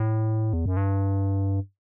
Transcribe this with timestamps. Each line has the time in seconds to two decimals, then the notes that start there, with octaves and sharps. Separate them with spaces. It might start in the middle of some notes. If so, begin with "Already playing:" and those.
Already playing: A2
0.53 E2
0.66 F#2
0.77 G2